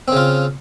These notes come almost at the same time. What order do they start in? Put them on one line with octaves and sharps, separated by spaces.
C4 C#3 F4